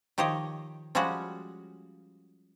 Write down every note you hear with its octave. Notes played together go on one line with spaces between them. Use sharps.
D#3 F3 G4 C#5 D#5
F3 G3 G#3 C#4 F#4 F#5